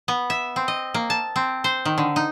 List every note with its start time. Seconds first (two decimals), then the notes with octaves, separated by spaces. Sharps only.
0.08 B3
0.30 E5
0.56 C4
0.68 D#5
0.94 A#3
1.10 A5
1.36 C4
1.64 C5
1.85 D#3
1.98 D3
2.16 D#4